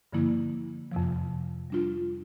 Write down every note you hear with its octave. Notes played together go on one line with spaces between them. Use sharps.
G2 D3 F3 A#3 E4
F2 C3 F3
G3 D4 F4